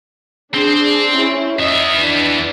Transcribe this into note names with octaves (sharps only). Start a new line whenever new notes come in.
C4 D4 G#4 C5
C#4 E4
E2 D#5 E5
E3 D4